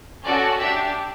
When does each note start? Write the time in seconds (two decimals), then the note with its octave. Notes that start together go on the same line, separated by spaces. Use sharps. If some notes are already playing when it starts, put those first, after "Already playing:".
0.24 C#4 F#4 A4 D5
0.60 D4 G4 E5